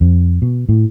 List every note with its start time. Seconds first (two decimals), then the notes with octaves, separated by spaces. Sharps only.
0.01 F2
0.42 B2
0.69 A2